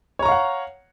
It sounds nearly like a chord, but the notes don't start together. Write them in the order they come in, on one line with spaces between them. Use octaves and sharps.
C#5 A#5 C#6 F5 F#5